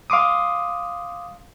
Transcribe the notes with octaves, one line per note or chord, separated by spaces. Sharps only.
F5 C6 D6 D#6